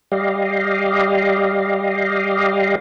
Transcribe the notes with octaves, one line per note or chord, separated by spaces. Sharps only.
G3 G4 D#5 F5